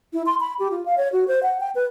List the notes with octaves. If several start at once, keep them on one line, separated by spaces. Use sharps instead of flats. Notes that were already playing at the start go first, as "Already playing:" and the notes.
E4
C6
B5
G4
F4
F5
C#5
F#4
C5
F#5
G5
B4